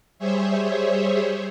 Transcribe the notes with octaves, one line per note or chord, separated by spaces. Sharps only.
G3 G#4 C5 C#5 E5